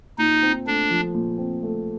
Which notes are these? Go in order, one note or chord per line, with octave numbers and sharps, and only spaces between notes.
A#2 D#4
C4
A3 D4
F3
A#2
C4
A3